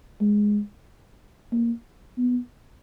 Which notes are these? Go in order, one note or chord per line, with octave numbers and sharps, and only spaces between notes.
G#3
A#3
B3